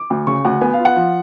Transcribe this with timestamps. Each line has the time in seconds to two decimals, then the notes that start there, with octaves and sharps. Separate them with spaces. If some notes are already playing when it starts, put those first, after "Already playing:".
Already playing: D6
0.10 D2
0.27 C#3 C#6
0.45 D2 F#5
0.61 B3 G#5
0.73 F5
0.79 F4
0.85 F#5
0.96 F3